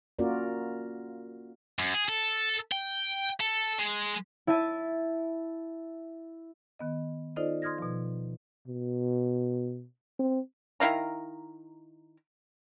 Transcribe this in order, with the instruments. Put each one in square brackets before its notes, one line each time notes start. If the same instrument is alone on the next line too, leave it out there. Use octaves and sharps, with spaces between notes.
[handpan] A#3 C#4 F4 F#4 A#4 D5
[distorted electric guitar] F#2
G#4
A4
G5
A4
G#3
[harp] E4 E5 A5 A6 D#7
[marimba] D#3 B3 D#5
D#4 F4 A4 C5 D5 D#5
C6 D#6 F6 G#6 A#6
B2 F3
[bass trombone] B2
C4
[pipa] D#3 E4 F5 A#5